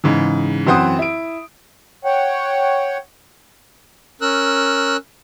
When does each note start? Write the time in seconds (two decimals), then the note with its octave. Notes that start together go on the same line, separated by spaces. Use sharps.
0.04 G#2 C#3 E3
0.67 F#2 E3 C4 C5 F#5 D#6
0.99 E4 D7
2.05 C#5 F#5 G5
4.21 C#4 A#4 E6 F#6